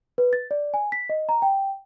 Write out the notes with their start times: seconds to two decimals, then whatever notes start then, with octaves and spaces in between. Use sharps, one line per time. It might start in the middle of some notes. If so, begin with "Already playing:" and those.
0.18 B4
0.33 A6
0.51 D5
0.74 G#5
0.92 B6
1.09 D#5
1.29 A#5
1.42 G5